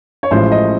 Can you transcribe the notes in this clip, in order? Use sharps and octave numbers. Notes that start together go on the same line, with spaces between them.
C#5
A1 A2 F3 G#3 C5
D#5